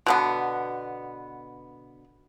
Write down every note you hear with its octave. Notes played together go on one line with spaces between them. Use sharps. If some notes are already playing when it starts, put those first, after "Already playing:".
B2 D3 B3